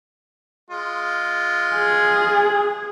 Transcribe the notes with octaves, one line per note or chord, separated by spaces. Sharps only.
G#3 F4
G#4